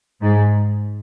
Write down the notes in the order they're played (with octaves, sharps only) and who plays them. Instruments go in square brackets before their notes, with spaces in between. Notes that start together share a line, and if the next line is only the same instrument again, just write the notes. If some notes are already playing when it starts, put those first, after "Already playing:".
[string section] G#2